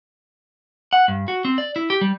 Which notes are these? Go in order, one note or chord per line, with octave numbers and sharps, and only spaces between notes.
F#5
G2
F#4
C4
D5
E4
G4
G3